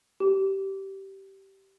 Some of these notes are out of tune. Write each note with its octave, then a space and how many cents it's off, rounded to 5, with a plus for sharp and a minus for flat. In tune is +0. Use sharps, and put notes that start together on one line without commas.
G4 -15